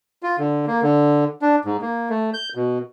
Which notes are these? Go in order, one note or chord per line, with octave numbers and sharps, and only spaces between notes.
F4
D3
A#3
D3
D4
G#2
A#3
A3
G6
B2